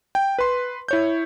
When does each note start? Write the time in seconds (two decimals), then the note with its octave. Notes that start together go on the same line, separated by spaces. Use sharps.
0.15 G5
0.38 B4 C6
0.88 E4 C#5 G6